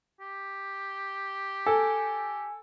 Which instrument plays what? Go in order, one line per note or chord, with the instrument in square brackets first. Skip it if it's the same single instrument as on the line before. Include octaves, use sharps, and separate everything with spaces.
[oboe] G4
[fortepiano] A4 [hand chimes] G#5